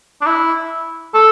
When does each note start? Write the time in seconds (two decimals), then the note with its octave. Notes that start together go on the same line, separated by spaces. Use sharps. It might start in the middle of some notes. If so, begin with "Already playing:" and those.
0.22 D4
0.26 E4
1.14 A4